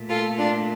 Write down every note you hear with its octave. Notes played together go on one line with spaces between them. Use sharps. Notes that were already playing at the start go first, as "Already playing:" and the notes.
Already playing: A#2 A3
F4 A4
D4 F4